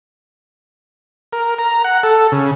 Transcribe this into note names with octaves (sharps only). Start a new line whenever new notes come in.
A#4
A#5
F#5
A4
C#3